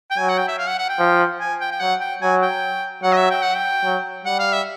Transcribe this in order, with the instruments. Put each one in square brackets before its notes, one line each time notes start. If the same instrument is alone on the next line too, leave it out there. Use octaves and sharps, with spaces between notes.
[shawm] G5
[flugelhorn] F#3 [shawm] G#5
[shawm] F#5
G5
E5
F5
F#5
F#5
G5
[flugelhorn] F3
[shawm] G#5
G5
G5
[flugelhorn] F#3 [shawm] F#5
[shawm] G5
[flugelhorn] F#3 [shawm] G#5
[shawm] G5
[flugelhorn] F#3 [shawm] F#5
[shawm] D#5
E5
G5
F#5
G5
[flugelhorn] F#3
[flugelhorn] G3 [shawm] F#5
[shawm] F5
E5